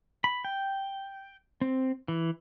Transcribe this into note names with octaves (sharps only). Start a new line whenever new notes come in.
B5
G5
C4
E3